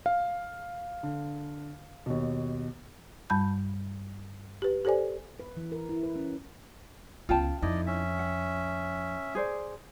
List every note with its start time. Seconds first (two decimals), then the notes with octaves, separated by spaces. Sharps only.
0.06 F5
1.03 D3
2.06 D#2 B2
3.30 G2 G3 A5 B5 G6
4.62 G4 B4
4.85 G4 A4 C5 D5 G#5
5.40 B4
5.57 E3
5.72 A#4
5.89 E4
6.03 B4
6.16 C#4
7.29 C#2 B3 F4 G5 A5
7.62 F2 D#4 E4 D5 D#5
7.86 C#4 E5
8.19 F#5
9.35 G#4 C5 D5